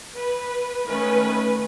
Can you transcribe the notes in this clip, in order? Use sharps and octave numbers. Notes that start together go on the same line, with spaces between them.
B4
D#3 A3 C#4 B4